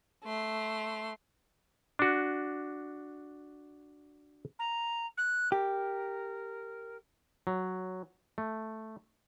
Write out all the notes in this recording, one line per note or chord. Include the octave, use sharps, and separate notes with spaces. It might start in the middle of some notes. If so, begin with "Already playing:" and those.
A3 C6
D4 F#4
A#5
F#6
G4 A#4
F#3
A3